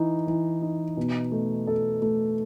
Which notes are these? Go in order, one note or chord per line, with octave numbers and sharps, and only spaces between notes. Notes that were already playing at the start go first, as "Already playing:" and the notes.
Already playing: E3 D#4
E3
D#4
B2
A3
A4
A3